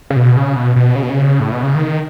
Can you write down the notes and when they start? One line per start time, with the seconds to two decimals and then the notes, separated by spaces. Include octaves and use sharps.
0.10 C#3
0.16 B2
0.36 C#3
0.56 B2
0.76 B2
0.95 C#3
1.03 B2
1.10 C#3
1.40 A2
1.52 B2
1.63 C#3
1.75 D#3